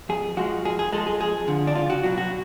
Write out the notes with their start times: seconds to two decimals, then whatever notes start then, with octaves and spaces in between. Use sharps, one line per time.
0.09 F2 G#4
0.37 F3 G#3 F#4
0.65 F2 G#4
0.79 G#4
0.93 F3 G#3 A4
1.07 G#4
1.21 F2 G#4
1.48 D3 F3
1.67 D4
1.75 C#2 F4
1.90 F#4
2.03 B2 F#3 F#4
2.18 F#4